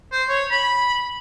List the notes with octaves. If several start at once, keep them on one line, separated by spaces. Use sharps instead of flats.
C5
C#5
B5